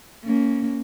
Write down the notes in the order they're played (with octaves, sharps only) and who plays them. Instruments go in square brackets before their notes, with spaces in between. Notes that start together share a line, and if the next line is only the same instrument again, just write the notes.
[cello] A#3 C#4